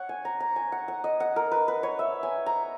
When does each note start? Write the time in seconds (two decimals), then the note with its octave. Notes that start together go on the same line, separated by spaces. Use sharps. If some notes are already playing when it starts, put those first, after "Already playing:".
Already playing: C#5 F#5
0.09 G#5
0.25 A#5
0.40 A#5
0.56 G#5
0.72 F#5
0.88 F#5
1.04 D#5
1.20 F#5
1.36 A#4
1.52 B4
1.68 B4
1.83 C#5
1.99 E5
2.23 G#5
2.46 A#5